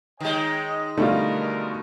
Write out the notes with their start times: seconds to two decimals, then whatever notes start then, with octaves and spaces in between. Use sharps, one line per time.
0.20 D#3 G#3 C#5 D#5 G5
0.97 B2 D3 G3 A3 D#4 F4 A#4